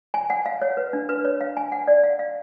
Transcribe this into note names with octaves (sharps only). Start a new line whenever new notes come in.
G#5
F#5
F5
C#5
B4
D4
B4
C#5
F5
G#5
F#5
D5
F5
F5